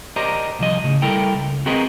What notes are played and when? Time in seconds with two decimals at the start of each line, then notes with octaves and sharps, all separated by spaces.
0.16 G4 A#4 C5 D5 D#5 A#5
0.59 C2 F3 D#5
0.84 A2 C#3
1.02 G3 E4 A4 A#4 G5
1.35 C#2
1.66 C4 F#4 G#4 A#4 B4 D#5